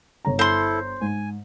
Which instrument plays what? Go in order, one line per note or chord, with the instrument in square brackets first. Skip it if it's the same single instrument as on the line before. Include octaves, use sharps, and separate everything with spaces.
[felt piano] G1 C#5 A#5
[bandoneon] E4 A4 [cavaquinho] C5 C6
[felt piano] G#2 [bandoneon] G#5